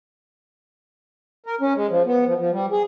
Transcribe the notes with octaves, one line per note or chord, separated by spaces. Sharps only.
A#4
C#4
G#3
F3
B3
F3
F3
G3
G#4